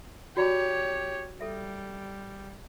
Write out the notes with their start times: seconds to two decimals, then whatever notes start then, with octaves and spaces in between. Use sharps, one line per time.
0.37 F#4 G4 C#5 D5 A#5
1.41 G3 A4 E5